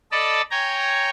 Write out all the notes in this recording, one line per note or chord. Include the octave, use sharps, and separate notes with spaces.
A4 D5 D#5 A5 B5
C#5 G5 G#5 A#5